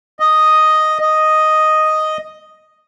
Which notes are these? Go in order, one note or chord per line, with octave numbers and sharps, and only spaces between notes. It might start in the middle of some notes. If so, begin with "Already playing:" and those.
D#5
D#5